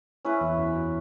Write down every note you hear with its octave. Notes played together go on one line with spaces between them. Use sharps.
C#4 E4 B4
E2 E3
F#2 F#3
F#3